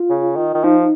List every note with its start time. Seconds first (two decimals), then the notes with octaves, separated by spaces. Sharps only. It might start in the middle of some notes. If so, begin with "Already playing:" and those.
Already playing: F4
0.10 C#3
0.36 D#3
0.55 D#3
0.64 F3 D#4